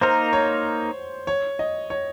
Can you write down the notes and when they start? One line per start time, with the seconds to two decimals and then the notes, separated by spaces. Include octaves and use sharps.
0.01 A#3 D#4 A#4 C5
0.33 C#5
1.27 C#5
1.59 D#5
1.90 C#5